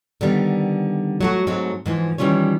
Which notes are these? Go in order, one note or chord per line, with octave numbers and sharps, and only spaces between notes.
D3 D#3 G3 B3
F#3 A3 F#4
G#2 F#3 G#3 A3 C4
G#2 E3 F3
D#3 E3 G3 C#4 F4 C#5